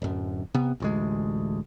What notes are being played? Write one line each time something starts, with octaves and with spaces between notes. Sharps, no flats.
D1 F#2
C3 B3
A1 D2 G#3